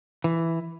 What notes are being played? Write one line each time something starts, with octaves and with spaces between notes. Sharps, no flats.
E3